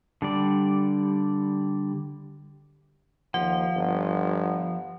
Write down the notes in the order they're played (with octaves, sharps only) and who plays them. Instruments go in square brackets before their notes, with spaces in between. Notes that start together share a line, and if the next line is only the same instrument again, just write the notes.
[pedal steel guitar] D3 G3 D5
[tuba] D#2 [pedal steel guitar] F3 [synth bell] F#5
[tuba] G1